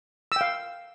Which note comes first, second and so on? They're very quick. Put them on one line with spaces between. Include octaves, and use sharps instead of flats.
E6 G5 F5